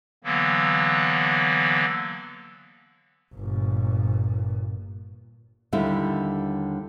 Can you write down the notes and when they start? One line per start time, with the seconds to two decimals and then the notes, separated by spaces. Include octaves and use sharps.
0.24 D3 E3 F#3 A#3 B3
3.35 G1 A#2
5.72 D#2 D3 G3 E4 E5